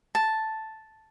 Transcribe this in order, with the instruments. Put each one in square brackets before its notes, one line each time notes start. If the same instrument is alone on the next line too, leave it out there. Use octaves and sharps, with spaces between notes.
[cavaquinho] A5